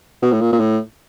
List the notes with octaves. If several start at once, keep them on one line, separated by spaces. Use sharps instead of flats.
B2
A2
A#2
A#2
A2